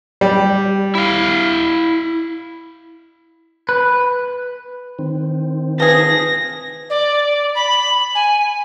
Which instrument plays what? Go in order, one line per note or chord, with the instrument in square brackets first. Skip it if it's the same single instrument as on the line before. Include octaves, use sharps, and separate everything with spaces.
[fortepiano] G3
[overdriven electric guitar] E4 F5
[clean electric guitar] B4
[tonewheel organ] D#3 C4
[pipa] F3 G#4 [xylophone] B4 D#6 [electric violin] A#6
[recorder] D5
B5
G#5